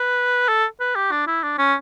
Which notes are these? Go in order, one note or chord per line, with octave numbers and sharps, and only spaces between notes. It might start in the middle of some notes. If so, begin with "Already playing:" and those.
Already playing: B4
A4
B4
G4
D4
E4
D4
C#4